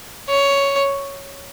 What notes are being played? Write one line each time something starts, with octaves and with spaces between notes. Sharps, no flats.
C#5